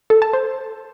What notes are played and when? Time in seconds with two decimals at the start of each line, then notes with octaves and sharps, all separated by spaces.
0.10 A4
0.22 A5
0.33 C5